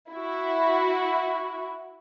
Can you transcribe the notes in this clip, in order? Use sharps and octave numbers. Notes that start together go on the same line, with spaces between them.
E4 F#4